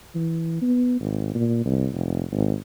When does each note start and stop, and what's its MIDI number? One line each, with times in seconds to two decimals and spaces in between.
0.15 0.57 52
0.62 0.96 59
1.00 1.32 32
1.35 1.61 46
1.65 1.88 36
1.94 2.23 29
2.32 2.55 32